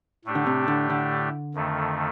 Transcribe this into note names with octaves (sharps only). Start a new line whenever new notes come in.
A2 A3 D4 G4
D3
C3
D3
D3
F2 D#3 A3